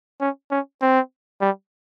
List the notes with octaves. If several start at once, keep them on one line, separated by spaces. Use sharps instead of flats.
C#4
C#4
C4
G3